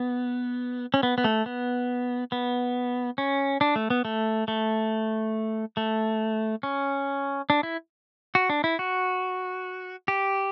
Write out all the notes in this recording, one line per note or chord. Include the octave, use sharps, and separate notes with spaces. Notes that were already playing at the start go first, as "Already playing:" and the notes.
Already playing: B3
C#4
B3
B3
A3
B3
B3
C#4
D4
A3
B3
A3
A3
A3
C#4
D4
E4
F#4
D4
E4
F#4
G4